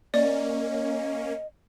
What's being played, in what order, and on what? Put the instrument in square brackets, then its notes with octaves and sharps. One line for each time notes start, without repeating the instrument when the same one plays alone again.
[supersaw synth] A#3 C#4 [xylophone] D5 [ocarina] D#5